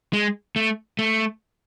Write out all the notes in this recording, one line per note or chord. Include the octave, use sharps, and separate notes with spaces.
G#3
A3
A3